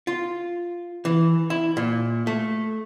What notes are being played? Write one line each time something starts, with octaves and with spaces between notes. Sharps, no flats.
F4
E3
E4
A#2
A3